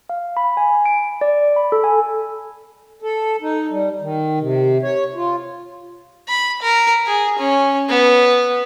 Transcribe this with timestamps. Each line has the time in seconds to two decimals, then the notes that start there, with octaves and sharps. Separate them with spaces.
0.09 F5
0.37 B5
0.57 G#5
0.86 D7
1.21 D5
1.56 B5
1.72 A4
1.84 G#5
3.02 A4
3.42 D#4
3.70 G3
4.01 D#3
4.40 C3
4.83 C#5
5.15 F4
6.29 B5
6.62 A#4
7.07 G#4
7.39 C#4
7.89 B3